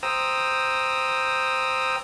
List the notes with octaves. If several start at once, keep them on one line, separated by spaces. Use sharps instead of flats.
C5 G5 A#5 D#6 E6